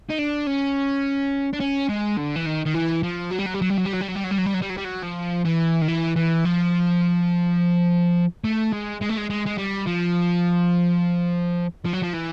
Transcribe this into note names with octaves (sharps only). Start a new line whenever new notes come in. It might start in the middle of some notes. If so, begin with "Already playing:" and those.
D#4
D4
C#4
D4
C#4
G#3
D3
E3
D#3
D#3
E3
F3
F#3
G3
F#3
G3
F#3
G3
F#3
G3
F#3
G3
F#3
G3
F#3
G3
F#3
G3
F#3
G3
F#3
G3
F#3
F3
E3
D#3
E3
E3
F3
A3
G#3
G#3
A3
G#3
G#3
G#3
G3
F3
F3
F#3
F3
E3